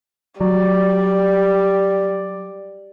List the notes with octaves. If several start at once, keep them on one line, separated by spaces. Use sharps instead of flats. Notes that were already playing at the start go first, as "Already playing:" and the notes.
F#3 G3 D5